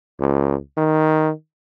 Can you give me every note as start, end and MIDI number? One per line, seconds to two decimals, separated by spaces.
0.20 0.55 37
0.77 1.31 51